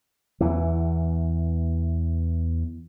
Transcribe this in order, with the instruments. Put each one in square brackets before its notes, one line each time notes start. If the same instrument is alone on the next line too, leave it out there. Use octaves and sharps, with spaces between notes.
[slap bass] E2 E3